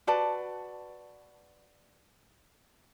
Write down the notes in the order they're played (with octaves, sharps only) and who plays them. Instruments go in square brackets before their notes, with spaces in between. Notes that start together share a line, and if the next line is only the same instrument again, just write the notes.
[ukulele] F#4 B4 D5 A5